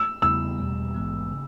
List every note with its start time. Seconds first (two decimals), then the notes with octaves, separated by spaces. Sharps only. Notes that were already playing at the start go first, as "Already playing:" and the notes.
Already playing: E6
0.22 E2 C#3 G3 B3 E4 E6
0.58 E2 B2 G3
0.95 A#1 G#2 E3 G#3 B3
1.32 C#3